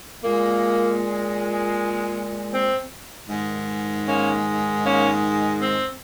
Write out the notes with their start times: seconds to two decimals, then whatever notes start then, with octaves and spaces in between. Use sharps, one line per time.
0.23 A#2 G#3 A#3
2.53 C4
3.29 G#2 D#3 G#3
4.07 A#3 C#4
4.84 A#3 C#4
5.60 C4